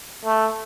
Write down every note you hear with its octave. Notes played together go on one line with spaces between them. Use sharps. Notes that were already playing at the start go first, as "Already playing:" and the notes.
A3